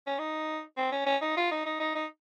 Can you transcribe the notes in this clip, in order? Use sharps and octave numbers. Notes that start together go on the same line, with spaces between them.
C#4
D#4
C4
C#4
C#4
D#4
F4
D#4
D#4
D#4
D#4